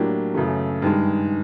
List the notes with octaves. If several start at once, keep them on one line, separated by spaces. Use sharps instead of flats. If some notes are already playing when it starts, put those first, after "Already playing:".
Already playing: A2 F#3 A#3 D4 G4
F#2 C#3 E3 A3
G2 D#3 G#3